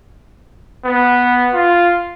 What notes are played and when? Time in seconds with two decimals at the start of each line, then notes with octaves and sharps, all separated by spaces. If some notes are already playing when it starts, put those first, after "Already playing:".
0.85 B3
1.54 F4